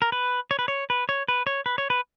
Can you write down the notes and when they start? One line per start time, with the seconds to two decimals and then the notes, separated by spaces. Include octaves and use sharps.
0.02 A#4
0.12 B4
0.51 C#5
0.59 B4
0.68 C#5
0.90 B4
1.09 C#5
1.28 B4
1.47 C#5
1.66 B4
1.78 C#5
1.90 B4